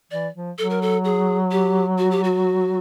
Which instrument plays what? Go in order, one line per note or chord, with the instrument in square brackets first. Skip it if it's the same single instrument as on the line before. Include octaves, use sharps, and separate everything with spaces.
[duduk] E3 [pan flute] D5
[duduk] F3
[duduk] F#3 [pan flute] A4
[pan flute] A#4
A4
G#4
G4
F#4
G4
F#4